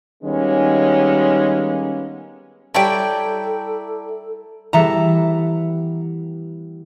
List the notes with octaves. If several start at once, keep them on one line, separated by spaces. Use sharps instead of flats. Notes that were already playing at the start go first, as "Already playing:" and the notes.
D#3 G3 G#3 A#3 B3 C#4
G3 E4 A4 C#5 D5 G5 A5 A#5
E3 G3 B3 A4 E5 A#5